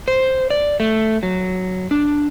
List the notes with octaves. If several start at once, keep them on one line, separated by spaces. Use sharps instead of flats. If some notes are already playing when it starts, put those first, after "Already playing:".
C5
D5
A3
F#3
D4